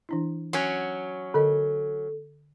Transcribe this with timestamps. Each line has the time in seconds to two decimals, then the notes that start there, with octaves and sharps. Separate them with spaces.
0.09 E3 D4 E4
0.53 F#3 C#4
1.34 D3 A4 A#4 D#5